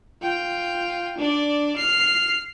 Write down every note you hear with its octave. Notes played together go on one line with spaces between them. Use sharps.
F4 G5
D4 D5
F6 C7